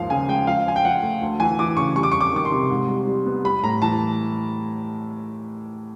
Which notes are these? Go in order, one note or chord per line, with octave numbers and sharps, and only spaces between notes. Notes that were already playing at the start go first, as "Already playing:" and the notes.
Already playing: D#2 G#2 F3 F5
C#3 G#5
G#3 G5
F3 F5
F3 G#5
G5
F3 F#5
A3
D2
E3 G#5
E3 D6
C#3 C#6
G3 C#6
D6
F2 C#6
D6
D#3 D6
C6
C3
G#2
G3
G3
B3
G3 B5
A2 A#5
E3 A5